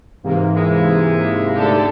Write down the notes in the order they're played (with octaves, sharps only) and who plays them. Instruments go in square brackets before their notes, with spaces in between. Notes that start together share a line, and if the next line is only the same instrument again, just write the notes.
[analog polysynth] G#2 C3 A#3 [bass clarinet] E3
[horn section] G#3 E4
[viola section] D3 G4 A4 [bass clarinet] A3